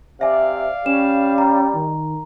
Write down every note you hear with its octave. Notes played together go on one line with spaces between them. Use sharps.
C3 D5 E5 F5 G#5
G3 C#4 E7
A#5
D#3